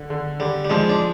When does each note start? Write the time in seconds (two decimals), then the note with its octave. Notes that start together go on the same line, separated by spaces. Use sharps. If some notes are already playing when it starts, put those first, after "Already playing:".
Already playing: D3
0.10 D3
0.40 D3 G3
0.65 G3
0.70 G#2 F3 G#3
0.89 D4